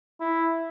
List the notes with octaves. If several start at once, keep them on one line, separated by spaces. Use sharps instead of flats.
E4